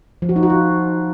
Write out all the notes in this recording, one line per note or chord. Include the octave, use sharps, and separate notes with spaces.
F3
F#4
D#4
F#4
F4